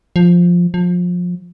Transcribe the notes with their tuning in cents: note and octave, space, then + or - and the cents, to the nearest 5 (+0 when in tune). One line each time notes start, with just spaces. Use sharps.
F3 +5
F3 +25